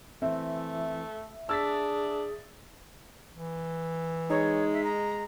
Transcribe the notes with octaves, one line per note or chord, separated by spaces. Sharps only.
E3 A3 C4 E5
D4 G#4 E6 A6 B6
E3
G#3 D#4 C#5
E5
A#5